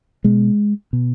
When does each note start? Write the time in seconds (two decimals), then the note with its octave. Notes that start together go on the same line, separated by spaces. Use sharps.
0.24 B2 G#3
0.93 B2